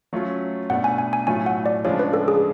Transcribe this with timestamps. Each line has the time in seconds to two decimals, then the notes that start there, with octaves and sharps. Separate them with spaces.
0.13 F#3 A3 C#4 F4
0.70 B2 A3 D4 F#5
0.84 G#5
0.98 G#5
1.13 G#5
1.27 A2 F#3 A3 F4 G#5
1.46 F#5
1.66 D5
1.85 C#3 F3 G#3 D4 F4 C#5
1.99 B4
2.13 A4
2.28 G#4